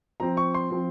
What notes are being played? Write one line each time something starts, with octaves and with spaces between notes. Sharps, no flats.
F3 C4 A#5
C#6
C6
F3 C4